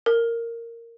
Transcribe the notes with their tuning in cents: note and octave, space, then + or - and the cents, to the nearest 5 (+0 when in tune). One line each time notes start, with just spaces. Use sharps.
A#4 -10